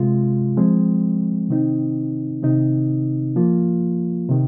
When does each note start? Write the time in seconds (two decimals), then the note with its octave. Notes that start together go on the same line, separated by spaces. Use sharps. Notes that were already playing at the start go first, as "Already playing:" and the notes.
Already playing: C3 G#3 F4
0.57 F3 G#3 C4
1.49 C3 D#3 C4 D#4
2.43 C3 D#3 C4 D#4
3.36 F3 A#3 F4
4.29 C3 D#3